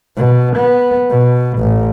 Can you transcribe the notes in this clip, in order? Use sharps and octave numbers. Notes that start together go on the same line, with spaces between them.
B2
B3
B2
A1